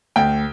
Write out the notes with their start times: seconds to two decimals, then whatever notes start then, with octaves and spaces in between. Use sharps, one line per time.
0.16 D2 G5